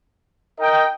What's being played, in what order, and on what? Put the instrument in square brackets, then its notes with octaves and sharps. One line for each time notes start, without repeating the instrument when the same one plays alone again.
[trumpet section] D#4 A#4 D#5 G5